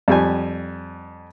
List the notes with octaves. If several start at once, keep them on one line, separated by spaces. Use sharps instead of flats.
F2 G3 G#5